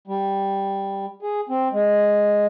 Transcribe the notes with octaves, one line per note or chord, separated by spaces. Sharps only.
G3
G#4
C4
G#3